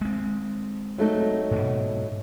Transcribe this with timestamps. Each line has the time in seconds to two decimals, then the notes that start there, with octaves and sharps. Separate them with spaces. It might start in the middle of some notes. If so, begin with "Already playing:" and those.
0.01 G#3 C4
0.98 F#3 A3 D#4
1.51 G#2 B2